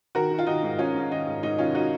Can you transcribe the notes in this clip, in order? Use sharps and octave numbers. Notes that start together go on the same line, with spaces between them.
D#3 F#4 A#4
D#3
F4
D#3 D#4 F#4
G#2
G#2 C#4 F4
G#2
D#3 D#4
G#2
G#2 D#4
D#3 C#4 F4
D#4 F#4